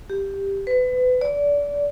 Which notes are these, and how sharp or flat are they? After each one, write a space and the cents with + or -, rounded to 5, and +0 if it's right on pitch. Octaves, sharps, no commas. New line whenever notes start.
G4 +5
B4 +30
D5 -25